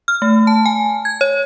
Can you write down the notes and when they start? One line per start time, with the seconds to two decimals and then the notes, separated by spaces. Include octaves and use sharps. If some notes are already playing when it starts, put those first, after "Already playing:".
0.08 F6
0.22 A3
0.47 A5
0.66 G#5
1.05 G#6
1.21 C#5